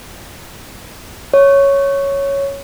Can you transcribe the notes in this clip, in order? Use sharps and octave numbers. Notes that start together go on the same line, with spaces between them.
C#5